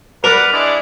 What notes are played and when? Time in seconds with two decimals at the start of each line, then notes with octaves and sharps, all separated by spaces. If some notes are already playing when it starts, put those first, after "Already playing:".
0.24 A#4 B4 D5 F#5
0.53 G#3 D4 E4 D5